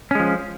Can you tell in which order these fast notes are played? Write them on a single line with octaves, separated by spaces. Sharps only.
C#4 G#3 F3